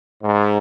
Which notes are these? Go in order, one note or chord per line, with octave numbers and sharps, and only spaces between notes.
G#2